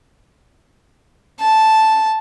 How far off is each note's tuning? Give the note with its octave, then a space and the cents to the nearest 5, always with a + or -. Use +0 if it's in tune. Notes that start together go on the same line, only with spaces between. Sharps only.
A5 -5